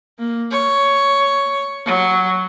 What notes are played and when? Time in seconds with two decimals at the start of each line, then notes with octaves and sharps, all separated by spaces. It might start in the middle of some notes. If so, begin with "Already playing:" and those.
0.19 A#3
0.51 C#5
1.86 F#3